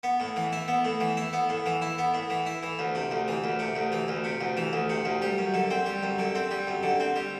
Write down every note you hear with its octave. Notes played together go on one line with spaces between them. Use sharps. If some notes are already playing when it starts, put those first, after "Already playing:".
B3
A2
E3
E4
B3
A2
E3
E4
B3
A2
E3
E4
B3
A2
E3
E4
E3
D2
C3
D2
E3
D2
C3
D2
E3
D2
C3
D2
E3
D2
C3
D2
G3
F#2
D3
C4
G3
F#2
D3
C4
G3
F#2
D3
C4
G3